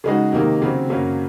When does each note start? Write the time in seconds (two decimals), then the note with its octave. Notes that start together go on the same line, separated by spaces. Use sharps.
0.04 C#3 G#3 D#4 F#4
0.32 C3 D#3 A#3 D#4
0.62 C#3 F#3 C4
0.89 F#2 C#3 F#3 A#3 C#4